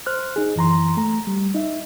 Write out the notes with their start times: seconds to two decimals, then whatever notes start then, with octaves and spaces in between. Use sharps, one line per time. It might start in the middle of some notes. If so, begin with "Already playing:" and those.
0.06 C5 F6 F#6
0.36 D#4 G#4
0.56 F#2 E3 A#5 C6
0.97 A3 A#5
1.27 G3
1.55 D#4 E5